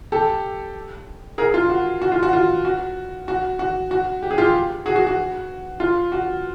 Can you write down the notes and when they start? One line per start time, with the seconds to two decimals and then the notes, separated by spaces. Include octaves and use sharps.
0.12 G4 A4
1.38 G#4 A#4
1.54 F4
1.70 F#4
2.02 F#4
2.12 F4
2.23 F#4
2.33 F4
2.65 F#4
3.28 F#4
3.59 F#4
3.91 F#4
4.23 G4
4.31 G#4
4.38 F4 G4
4.86 F#4 G#4
4.96 F#4
5.07 F#4
5.80 F4
6.12 F#4